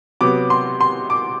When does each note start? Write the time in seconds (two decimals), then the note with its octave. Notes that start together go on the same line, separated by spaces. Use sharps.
0.21 C3 F#3 B3 D6
0.50 C6
0.81 C6
1.10 D6